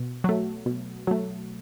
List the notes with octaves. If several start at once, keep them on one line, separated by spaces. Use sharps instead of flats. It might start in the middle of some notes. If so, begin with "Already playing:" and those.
Already playing: B2
F#3 A3
B2
F#3 A3